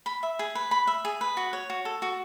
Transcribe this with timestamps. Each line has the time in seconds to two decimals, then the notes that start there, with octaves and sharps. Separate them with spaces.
0.06 B5
0.23 E5
0.39 G#4
0.55 B4
0.71 B5
0.87 E5
1.05 G#4
1.21 B4
1.37 F#4
1.53 C#5
1.70 F#4
1.85 A4
2.02 F#4